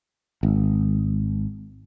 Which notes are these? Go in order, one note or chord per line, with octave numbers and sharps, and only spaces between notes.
G#1